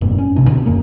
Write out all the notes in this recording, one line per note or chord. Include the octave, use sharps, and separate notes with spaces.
F1 G2 A#2 C4
C#4
A1 C3 D4
B2 D3 C4
D#1 F#2 A#3 C#4